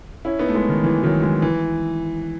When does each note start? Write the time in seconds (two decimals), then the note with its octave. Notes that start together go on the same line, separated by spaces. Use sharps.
0.25 C#4 E4
0.39 B3 D#4
0.48 A3
0.55 G#3 B3
0.69 D#3
0.84 E3
1.03 D#3 F#3
1.22 E3 G#3
1.42 E3